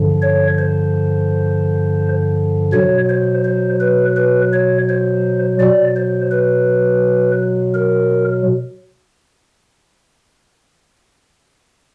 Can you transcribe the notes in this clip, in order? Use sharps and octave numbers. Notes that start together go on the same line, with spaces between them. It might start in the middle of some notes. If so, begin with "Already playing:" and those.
Already playing: G2 D3 F3
C#5
C5
B2 F#3 C#5
C5
C5
B4
B4
C#5
C5
B2 F#3 D5
C5
B4
A#4